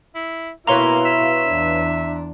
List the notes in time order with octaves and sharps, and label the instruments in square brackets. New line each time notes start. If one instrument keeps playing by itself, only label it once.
[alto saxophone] E4
[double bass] B2 E4 [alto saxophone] A#3 [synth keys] B4 C#5 F5 [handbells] A#5 C6
[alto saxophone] E5
[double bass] E2 D4